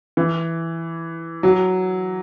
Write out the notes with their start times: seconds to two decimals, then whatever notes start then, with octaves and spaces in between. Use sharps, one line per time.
0.17 E3
1.43 F#3